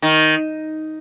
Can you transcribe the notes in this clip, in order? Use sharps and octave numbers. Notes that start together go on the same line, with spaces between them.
D#3